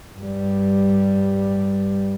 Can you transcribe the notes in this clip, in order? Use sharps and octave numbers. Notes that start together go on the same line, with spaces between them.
G2 G3